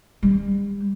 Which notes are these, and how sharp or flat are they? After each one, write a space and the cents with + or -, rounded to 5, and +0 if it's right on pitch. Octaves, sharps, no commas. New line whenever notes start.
G3 +40